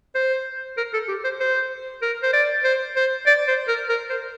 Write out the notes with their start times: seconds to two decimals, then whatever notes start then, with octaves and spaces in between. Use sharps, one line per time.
0.15 C5
0.77 A#4
0.93 A4
1.08 G4
1.24 C5
1.40 C5
2.02 A#4
2.23 C5
2.33 D5
2.64 C5
2.96 C5
3.27 D5
3.48 C5
3.68 A#4
3.89 A#4
4.10 C5